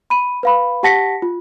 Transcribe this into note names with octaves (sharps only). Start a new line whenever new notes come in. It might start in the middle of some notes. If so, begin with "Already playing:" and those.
B5 D#7
B4 F5 B5
G4 F#5 A5 A#6 B6 C#7
F4